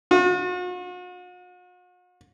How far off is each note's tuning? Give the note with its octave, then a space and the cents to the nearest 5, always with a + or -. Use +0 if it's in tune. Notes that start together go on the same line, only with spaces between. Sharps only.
F#4 -45